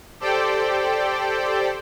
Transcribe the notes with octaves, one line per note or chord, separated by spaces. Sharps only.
G4 A4 C5 D5 G5